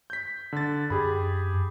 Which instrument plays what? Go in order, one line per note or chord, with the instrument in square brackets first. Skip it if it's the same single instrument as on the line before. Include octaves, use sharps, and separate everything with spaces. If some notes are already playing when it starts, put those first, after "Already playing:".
[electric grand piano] G6 B6
D3 A6
[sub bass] F#2 [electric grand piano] G4 G#4 B5